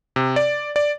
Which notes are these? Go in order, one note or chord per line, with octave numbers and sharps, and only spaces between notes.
C3
D5
D5